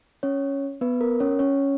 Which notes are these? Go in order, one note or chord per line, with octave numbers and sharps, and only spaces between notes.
C#4 C#5
B3 B4
A#4
C#4 C#5
C#4 C#5